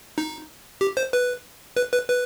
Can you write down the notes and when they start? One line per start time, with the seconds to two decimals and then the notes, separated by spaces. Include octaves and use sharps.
0.18 D#4
0.81 G4
0.97 C5
1.13 B4
1.77 B4
1.92 B4
2.08 B4